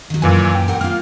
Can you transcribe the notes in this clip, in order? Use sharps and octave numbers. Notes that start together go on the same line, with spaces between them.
D#3 F#3
F#2 A#2 E3 G#5
G5
A#4 F#5
A#3 F4 F6